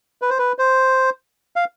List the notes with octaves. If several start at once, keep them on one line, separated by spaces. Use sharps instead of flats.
B4
C5
B4
C5
F5